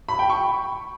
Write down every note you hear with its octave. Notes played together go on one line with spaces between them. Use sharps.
B5
G5
C#6